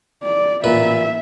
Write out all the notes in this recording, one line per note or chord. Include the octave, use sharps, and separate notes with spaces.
D5
A1 A#2 B4 E5